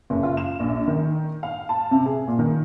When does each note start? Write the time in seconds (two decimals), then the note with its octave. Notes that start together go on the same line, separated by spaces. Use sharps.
0.10 F#1
0.23 F4
0.37 E7
0.60 A#1
0.88 D#3
1.43 F5
1.69 A5
1.91 C3
2.06 G#4
2.28 A#2
2.39 D#3